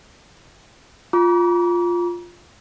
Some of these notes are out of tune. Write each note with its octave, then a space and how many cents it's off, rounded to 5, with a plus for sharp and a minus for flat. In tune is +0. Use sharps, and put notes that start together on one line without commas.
F4 +0 A#5 +35 D6 -35